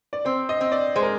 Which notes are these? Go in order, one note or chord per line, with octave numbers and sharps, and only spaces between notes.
D5
C4 C5
D#5
C4
D5
G#3 C5
A#4